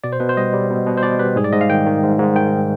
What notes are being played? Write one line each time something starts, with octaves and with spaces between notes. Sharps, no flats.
B2 D5
C5
B2 B4
C5
G3 D#5
G3
B2
B2
C5
B2 D5
G3 B4
G#2 G#4
D5
G#2 D#5
F5
D#3 G5
D#3
G#2
G#2
D#3 G5